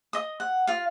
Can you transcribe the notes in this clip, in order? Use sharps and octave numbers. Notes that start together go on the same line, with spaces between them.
D#5 D#6
F#5
F4 F5